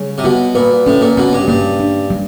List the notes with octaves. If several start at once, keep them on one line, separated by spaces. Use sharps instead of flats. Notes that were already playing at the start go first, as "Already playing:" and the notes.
Already playing: C#3 G3
C3
B2 F#4
A#2 B4
A2 C#4
A#2
B2 C#4
G2
G2 A#3
D4
G3